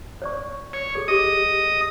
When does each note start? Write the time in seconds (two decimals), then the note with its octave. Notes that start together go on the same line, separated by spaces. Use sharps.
0.22 C#5 D5 C#6
0.73 C#5
0.95 G#4 A4
1.08 G4 G#4 D#5 D#6